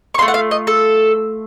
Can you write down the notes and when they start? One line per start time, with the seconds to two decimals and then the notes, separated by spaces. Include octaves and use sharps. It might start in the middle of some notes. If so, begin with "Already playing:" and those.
0.14 C#6
0.18 A3 C#4 F4 C6
0.28 F#5
0.34 F5
0.51 D#5
0.67 A4